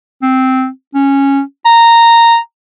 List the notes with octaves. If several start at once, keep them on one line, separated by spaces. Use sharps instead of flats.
C4
C#4
A#5